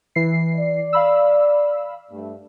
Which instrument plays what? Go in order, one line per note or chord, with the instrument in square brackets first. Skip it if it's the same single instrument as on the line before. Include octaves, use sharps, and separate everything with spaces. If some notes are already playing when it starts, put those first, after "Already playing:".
[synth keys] E3 C7
[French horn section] D5
[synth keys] F5 B5 E6
[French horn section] G2 A3